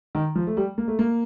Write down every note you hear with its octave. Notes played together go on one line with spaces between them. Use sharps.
D#3
F3
A3
G3
A#3
A3
A#3